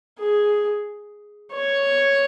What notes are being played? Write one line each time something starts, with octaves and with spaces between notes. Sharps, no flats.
G#4
C#5